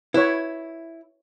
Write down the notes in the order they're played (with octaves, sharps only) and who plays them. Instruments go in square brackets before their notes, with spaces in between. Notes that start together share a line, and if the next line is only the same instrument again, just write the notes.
[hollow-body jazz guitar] E4 [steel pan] B4 C#5